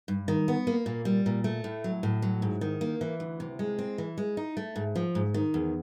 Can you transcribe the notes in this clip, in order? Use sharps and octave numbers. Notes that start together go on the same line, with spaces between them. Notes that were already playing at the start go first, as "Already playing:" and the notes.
G2
D#3
B3
A#3
A#2
G3
A#2
A3
A2
F#3
A2
F#3
G#2
D#3
A#3
E3
D2
C3
G#3
C4
E3
G#3
D#4
A3
G#2
F3
G#2
D#3
E2